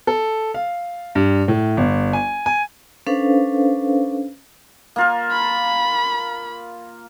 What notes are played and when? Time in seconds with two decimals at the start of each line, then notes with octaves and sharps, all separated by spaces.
0.07 A4
0.54 F5
1.15 G2
1.48 A2
1.77 G1
2.13 G#5
2.46 G#5
3.07 C#4 D4 A4 B4 C5 F5
4.96 A#3 F4 A#4
5.32 B5